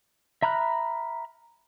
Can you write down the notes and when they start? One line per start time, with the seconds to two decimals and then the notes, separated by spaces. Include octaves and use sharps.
0.42 E5 A#5 B5 F6 F#6